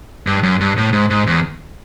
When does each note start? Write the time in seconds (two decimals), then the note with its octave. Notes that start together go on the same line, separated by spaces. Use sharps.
0.27 G2
0.43 F#2
0.60 G2
0.77 A2
0.93 G#2
1.10 G#2
1.27 E2